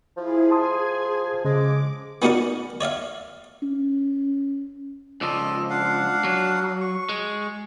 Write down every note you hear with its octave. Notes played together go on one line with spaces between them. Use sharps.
F3 E4 G#4
G#4 G#5 A5 C6 D#6
C#3 G#3 D6
B3 C#4 D#4 F#4 A#4 D5
C#5 D5 E5 F5
C#4
C#2 F3 A4 D5 D#5
D4 F5 F#5
F#3
C#6
G#3